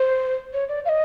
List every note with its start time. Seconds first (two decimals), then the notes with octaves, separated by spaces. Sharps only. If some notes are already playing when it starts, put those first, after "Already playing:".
Already playing: C5
0.53 C#5
0.69 D5
0.85 F5
0.89 D#5